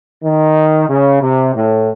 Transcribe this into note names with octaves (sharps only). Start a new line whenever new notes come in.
D#3
C#3
C3
A2